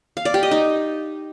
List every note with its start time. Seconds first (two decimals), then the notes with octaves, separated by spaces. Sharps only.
0.17 F5
0.25 D5
0.34 G4
0.43 D#5
0.51 D#4